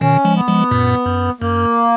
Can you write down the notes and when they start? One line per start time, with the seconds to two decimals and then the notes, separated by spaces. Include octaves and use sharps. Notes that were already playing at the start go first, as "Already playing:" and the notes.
0.01 B2 D#3 C#4
0.25 F3 G#3
0.36 B3
0.48 F3 G#3
0.71 F#2 A#2
1.06 F#2
1.41 F#2 A#3